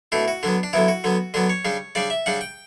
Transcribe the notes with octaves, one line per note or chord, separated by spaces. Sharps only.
B2 A3 D4 E4
F#4
D3 F#3 B3 D4
D4
D3 F#3 B3 E4
F#4
D3 F#3 B3
D3 F#3 B3 D4
C#5
C#3 G3 D4
C#3 G3 D4 D5
E5
C#3 G3 D4 F#5
G5